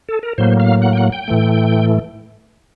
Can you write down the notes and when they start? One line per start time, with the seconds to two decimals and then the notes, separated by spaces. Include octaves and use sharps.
0.09 A4
0.23 A#4
0.38 A2 F#3 A#3 C5
0.60 F5
0.82 F#5
0.93 G5
0.97 F#5
1.12 G5
1.28 A2 E3 A3